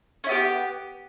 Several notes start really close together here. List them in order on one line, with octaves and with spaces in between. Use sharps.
C#4 E4 B3 G4